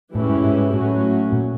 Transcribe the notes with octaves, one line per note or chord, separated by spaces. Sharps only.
A2 E3 G#3 C#4 E4 G4
G#2
A2
G#2
A2 F#3 A3 C#4 F#4
A#2